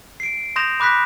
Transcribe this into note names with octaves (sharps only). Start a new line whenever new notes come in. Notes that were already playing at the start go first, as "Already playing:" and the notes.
C7 D7
C6 D#6 G6 A#6 E7 F7
B5 D6 F#6 A#6 B6